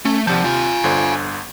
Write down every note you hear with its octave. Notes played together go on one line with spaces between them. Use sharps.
A3 C#4
D#2 C3 F3 D5 F#5 A5 G6
F4 F5 G#5
G1 D3 C5